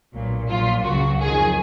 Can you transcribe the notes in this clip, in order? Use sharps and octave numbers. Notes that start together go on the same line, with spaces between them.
B1 A#2 F#3
A#1 A#2 F#3 F4
C#2 C#3 F#3 F#4
F2 D#3 F#3 G#4